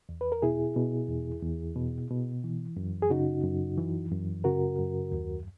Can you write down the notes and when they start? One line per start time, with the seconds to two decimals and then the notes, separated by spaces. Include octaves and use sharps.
0.09 E2
0.21 B4
0.32 A#4
0.42 B2 E4 G#4
0.77 B2
1.09 E2
1.43 E2
1.76 B2
2.11 B2
2.44 E3
2.77 F#2
3.02 G#4
3.10 C#3 D#4 F#4
3.44 F#2
3.77 E3
4.11 F#2
4.44 C#3 F#4 A#4
4.79 F#2
5.12 D#2